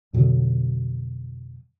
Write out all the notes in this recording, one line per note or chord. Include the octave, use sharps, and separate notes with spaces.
F2 B2 D3 F#3